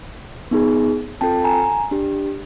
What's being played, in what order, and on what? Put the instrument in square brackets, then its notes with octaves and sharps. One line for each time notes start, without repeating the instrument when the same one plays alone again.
[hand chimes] B3 D#4 G#4
C4 F4 A4 G5 A5
G#5 A#5
D4 G4